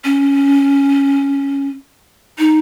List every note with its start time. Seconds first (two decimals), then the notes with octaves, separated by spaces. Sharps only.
0.04 C#4
2.39 D#4